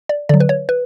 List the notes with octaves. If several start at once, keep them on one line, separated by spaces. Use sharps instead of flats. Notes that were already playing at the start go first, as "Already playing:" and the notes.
D5
D3 F#3 D5
B4
C#5
B4